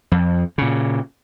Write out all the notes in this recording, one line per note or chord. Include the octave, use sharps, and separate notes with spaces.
F2
A#2 C#3